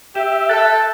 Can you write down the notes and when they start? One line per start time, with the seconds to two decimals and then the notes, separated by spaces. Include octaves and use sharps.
0.15 G4 E5
0.49 A4 F#6 A6